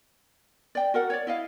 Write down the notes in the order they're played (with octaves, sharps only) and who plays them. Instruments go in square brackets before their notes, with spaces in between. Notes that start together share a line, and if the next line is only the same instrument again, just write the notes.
[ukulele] D5 G5
F#4 A#4 F#5
C#5 D5
E4 D#5 F5